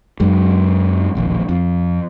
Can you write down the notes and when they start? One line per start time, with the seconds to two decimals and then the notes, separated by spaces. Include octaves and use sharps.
0.20 F#2 F#3 G#3
1.15 E1 A#1 D#2
1.49 F2